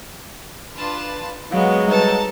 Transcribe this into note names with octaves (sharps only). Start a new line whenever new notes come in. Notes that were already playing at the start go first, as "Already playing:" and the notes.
D4 F4 B4 A5
F#3 G#3 B3 F5
G3 D#4 A4 B4 A5